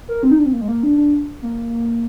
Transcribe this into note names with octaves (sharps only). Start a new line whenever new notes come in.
A#4
C4
D#4
D4
C4
A#3
G#3
A#3
D4
D4
A#3